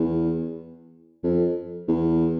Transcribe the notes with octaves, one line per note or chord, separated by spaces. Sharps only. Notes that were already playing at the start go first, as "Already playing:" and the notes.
Already playing: E2
F2
E2